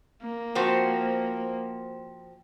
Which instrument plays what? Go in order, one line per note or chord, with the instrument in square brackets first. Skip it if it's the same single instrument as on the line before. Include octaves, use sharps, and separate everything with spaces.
[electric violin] A#3
[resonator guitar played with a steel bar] F3 C4 F#4